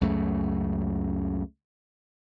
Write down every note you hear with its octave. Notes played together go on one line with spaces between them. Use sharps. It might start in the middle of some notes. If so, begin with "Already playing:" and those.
C#2 F#2 C#3 A3